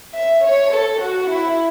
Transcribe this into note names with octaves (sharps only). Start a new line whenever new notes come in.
E5
C#5
A4
F#4
E4